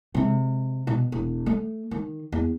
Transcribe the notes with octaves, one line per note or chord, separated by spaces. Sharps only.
C3 G#3
B2
E1
A3
D#3
E2